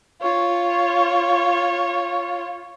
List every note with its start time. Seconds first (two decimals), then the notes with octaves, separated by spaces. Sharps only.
0.21 F4 C#5